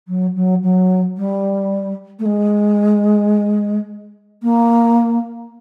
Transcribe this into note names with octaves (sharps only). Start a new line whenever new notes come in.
F#3
F#3
F#3
G3
A3
G#3
A#3